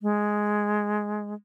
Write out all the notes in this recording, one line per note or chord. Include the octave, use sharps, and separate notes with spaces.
G#3